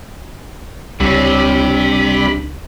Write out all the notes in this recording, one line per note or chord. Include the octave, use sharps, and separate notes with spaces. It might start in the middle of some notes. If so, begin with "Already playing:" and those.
C#2 C3 G3 D4 C#5 B5